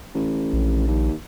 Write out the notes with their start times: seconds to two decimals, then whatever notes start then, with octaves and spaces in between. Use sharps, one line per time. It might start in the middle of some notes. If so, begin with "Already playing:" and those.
0.15 A1
0.53 A#1
0.87 D#2